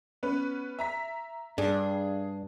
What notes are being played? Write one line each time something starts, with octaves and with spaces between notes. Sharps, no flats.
B3 C#4 B4
E5 A#5 B6
G2 D4 G#4